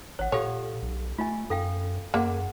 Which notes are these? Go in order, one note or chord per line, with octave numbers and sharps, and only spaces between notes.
A1 C#5 F#5
A#2 G4 A4 C#5 F5
B1
A3 F4 D#5 G#5
F#2 A4 F5 G5
F#2 A#3 G#4 F#5